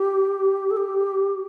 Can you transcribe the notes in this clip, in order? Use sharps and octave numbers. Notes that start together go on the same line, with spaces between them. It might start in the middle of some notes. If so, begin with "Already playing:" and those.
Already playing: G4
A4
G4